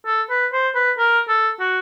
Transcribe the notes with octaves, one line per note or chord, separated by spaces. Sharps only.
A4
B4
C5
B4
A#4
A4
F#4